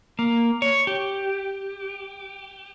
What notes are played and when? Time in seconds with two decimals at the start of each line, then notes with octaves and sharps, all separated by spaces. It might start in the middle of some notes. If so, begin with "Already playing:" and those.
0.19 A#3
0.62 C#5
0.87 G4